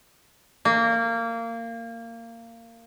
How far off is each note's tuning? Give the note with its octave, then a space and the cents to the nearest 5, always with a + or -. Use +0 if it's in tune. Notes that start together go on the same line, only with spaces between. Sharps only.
A#3 -20